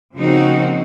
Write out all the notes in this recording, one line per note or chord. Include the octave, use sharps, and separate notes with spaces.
C#3 F3 A#3 C4 D#4 F#4